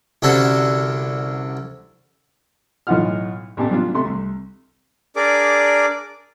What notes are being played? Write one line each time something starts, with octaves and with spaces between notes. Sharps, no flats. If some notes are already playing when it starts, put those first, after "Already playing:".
C2 D3 C#4 D4 F#4 A4
B1 A2 D#4 F4 F#5 F6
A1 A#2 B3 G4 A4 A5
F#3 B3 D4 F4
C3 A3 C6
C2
D4 G#4 A#4 D5 D6